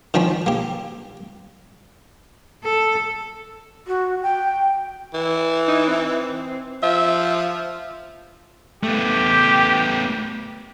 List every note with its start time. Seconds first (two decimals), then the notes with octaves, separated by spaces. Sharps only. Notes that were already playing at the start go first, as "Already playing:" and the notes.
0.14 D#3 F3 C#4 D4 F4
0.46 A#3 G4
2.64 A4
3.88 F#4
4.22 G5
5.14 E3
5.68 D#4
5.87 C4
6.83 F3 E5
8.83 A3 B3 G4